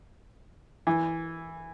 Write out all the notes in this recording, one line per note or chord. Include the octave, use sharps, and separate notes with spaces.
E3